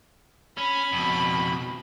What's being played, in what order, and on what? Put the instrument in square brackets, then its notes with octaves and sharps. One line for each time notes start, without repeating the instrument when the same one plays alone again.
[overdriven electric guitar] C#4 [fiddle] B5
[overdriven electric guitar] F2 B2